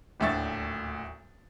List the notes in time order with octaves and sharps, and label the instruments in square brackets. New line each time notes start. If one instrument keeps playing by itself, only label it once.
[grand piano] D#1 D2 A2 E5 C#6 A6